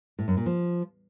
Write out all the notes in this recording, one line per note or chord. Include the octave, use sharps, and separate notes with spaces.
A2
F#2
A#2
F3